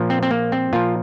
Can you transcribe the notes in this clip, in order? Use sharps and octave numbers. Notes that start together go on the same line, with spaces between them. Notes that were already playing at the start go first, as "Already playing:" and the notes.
Already playing: A#2 F3
C4
C4
A#3
C4
A#2 F3 F4